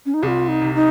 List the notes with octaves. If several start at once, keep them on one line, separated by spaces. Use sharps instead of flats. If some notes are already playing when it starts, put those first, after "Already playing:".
C#4
D#4
C2 F4 G#4
D#4
C3
D#4